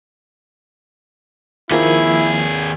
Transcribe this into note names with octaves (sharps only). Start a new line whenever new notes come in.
D#2 D#3 F3 A#3 E4 G#4